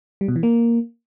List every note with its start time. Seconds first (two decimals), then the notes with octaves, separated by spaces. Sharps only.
0.21 G3
0.28 B2
0.36 E3
0.43 A#3